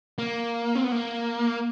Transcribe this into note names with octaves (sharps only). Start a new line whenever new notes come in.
A#3
C4
B3
A#3